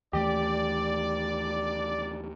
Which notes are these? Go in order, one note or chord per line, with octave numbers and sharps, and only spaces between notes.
D#2 E3 A3 G4 D5